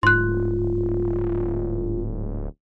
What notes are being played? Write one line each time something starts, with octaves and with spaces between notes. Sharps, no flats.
D1 G#2 F4 C6 F#6